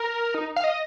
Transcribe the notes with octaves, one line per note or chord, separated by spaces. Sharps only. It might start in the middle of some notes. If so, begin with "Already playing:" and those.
Already playing: A#4
D#4
F5
D#5